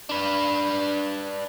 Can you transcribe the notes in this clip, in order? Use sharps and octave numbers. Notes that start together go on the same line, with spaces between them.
D4 B4